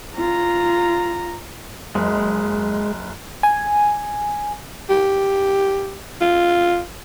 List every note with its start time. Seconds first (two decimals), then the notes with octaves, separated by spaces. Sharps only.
0.16 F4 A#5
1.95 F#1 G#3
3.43 G#5
4.90 G4
6.21 F4